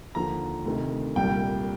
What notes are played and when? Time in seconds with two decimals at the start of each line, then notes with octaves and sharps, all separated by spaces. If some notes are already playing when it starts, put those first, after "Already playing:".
0.15 D#2 D3 F3 A#5
0.65 D2 C3 D#3
1.16 C2 A#2 G3 G5